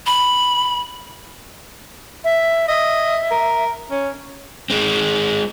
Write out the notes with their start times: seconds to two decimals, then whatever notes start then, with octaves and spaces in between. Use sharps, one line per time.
0.06 B5
2.24 E5
2.68 D#5 E5
3.31 A#4
3.90 C#4
4.70 G#3 C4